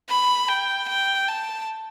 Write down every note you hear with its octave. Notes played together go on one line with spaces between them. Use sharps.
B5
G5
G5
A5